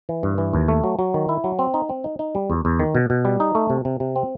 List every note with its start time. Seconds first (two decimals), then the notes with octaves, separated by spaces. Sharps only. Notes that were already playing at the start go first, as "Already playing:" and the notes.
0.09 E3
0.23 G2
0.38 E3
0.53 D#2
0.68 A3
0.84 F#3
0.99 F#3
1.14 D#3
1.29 E4
1.44 F#3
1.59 C4
1.74 D#4
1.89 C4
2.04 D#4
2.19 D#4
2.35 G3
2.50 E2
2.65 E2
2.80 D#3
2.95 B2
3.10 B2
3.25 G3
3.40 D#4
3.55 A3
3.70 C3
3.85 C3
4.00 C3
4.16 C4